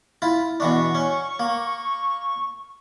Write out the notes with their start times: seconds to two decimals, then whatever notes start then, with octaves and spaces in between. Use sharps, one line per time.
0.22 E4 F4
0.60 B2 E3 D4 C#6
0.95 C#4
1.39 A#3